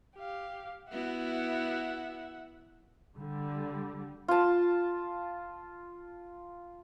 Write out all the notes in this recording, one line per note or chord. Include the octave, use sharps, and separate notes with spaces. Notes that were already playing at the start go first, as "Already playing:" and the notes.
G4 F5
B3 E4 F#4 E5 F#5
D3 G3
F4 A5